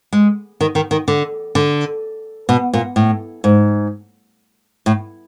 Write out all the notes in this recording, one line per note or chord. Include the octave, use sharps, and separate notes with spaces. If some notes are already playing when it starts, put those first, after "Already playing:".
G#3
D#3
D#3
D#3
D3
D3
B2
A#2
A2
G#2
A2